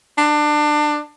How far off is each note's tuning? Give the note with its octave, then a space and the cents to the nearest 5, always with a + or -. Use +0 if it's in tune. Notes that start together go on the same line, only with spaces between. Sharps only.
D4 +25